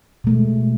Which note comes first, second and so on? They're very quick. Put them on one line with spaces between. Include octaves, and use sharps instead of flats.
B2 A3 G#3